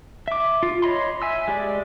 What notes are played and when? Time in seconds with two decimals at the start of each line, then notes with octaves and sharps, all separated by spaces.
0.28 E5 D6
0.63 F4
0.82 C#5 D#5 B5 C6
1.22 E5 G#5 E6
1.48 G#3 G4 D5